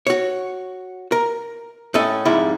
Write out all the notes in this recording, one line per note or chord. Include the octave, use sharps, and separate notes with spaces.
F#4 C#5
A#4
A2 A3 C#4 A4 D#5
F2 G#2 G3 E4